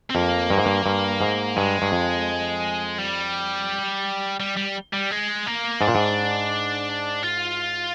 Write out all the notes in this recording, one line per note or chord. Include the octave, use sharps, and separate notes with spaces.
C4
F2 A#3
G2
G#2
G2
G2
G#2
G2 G#3
G2
F2
G3
G3
G3
G3
G#3
A#3
G#2 D4
A#2
G#2
F4